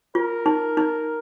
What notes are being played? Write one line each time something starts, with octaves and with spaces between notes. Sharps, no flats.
F4 A#4
D#4
D#4